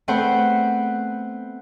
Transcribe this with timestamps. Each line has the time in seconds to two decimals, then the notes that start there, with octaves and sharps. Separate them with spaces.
0.08 A3 B3 C4 B4 C5 F#5